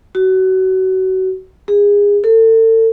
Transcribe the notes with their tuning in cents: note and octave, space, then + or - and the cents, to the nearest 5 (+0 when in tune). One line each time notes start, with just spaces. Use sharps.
F#4 +25
G#4 -25
A4 +35